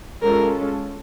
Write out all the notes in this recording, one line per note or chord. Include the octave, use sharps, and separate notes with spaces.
G#3 C#4 F4 A4 A#4